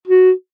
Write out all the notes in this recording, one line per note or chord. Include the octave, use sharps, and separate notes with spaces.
F#4